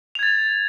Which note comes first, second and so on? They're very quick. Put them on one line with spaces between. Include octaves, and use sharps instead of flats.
F7 G#6 A6